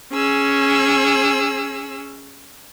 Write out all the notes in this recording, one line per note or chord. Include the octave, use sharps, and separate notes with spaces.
C#4 G#4 E6